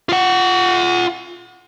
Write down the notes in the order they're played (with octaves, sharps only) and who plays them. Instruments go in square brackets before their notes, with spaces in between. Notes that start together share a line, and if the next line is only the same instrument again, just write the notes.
[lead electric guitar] F4 F#5